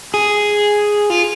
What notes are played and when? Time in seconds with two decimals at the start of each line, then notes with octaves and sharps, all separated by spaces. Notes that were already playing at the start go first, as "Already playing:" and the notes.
0.14 G#4
1.10 F4